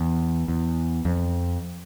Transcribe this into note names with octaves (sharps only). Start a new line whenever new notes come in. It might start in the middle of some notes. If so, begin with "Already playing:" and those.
Already playing: E2
E2
F2